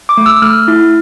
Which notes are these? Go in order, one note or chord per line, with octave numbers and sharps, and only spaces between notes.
D6
A3
E6
A3 F6
E4